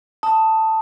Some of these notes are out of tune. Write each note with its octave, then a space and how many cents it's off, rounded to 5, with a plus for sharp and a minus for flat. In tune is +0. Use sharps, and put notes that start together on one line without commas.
A5 +10 D#6 +10